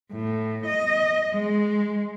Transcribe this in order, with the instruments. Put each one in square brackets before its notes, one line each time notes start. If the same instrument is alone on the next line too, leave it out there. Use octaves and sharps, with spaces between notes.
[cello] A2
D#5
G#3